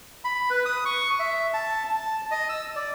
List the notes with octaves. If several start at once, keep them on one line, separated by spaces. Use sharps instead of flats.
B5
B4
D#6
C#6
E5
A5
A5
D#5
E6
D5